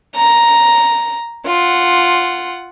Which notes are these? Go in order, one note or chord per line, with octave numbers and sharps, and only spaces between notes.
A#5
F4 F#5